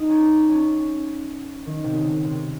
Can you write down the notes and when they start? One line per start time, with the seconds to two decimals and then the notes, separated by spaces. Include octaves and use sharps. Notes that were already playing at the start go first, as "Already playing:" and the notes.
Already playing: D#4
0.10 C#4
0.49 C#4
1.66 D#3
1.84 C3
1.95 C#3
2.24 C3